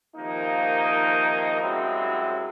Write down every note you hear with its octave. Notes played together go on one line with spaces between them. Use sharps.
C3 D#3 F3 A#3 D#4
C2 F#2 F#3 G#3 C4 E4